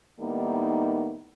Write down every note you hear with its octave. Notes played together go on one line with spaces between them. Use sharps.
A2 D#3 G3 A#3 B3 D#4